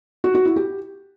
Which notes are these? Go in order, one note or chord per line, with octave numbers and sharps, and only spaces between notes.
F#4
F#4
E4
G4